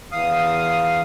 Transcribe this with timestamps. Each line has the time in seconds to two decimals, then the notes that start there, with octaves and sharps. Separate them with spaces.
0.12 E2 F5 D#6